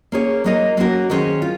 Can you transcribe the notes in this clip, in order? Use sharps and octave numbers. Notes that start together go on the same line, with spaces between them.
A#3 C#4 G#4 C#5
F#3 A#3 D#4 A#4 D#5
F#3 A#3 C#4 F#4 A#4
D#3 F#3 C#4 G#4 C5
F4